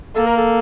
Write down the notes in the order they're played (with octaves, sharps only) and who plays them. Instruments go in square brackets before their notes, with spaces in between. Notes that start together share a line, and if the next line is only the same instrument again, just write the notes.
[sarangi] A#3 [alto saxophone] A4
[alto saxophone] A#4
A4